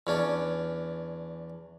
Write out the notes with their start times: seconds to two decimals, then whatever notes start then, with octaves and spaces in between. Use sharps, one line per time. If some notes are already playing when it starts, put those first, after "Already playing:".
0.07 E2 C#4 D4